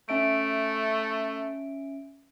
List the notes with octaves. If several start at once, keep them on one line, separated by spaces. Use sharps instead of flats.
A3 C#4 E5 D7